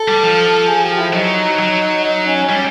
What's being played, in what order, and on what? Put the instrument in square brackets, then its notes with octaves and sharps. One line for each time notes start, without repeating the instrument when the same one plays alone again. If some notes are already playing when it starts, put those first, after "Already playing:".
Already playing: [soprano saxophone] A4
[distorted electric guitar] G3
F3
[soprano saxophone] G#4
G4
E4
[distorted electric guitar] F#3 [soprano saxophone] D#4
[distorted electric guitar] F#3
[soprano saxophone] D#4
C#4
[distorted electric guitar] G3 [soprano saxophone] C#4